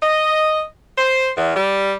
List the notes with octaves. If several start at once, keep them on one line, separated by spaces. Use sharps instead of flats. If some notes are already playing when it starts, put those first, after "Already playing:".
D#5
C5
E2
G3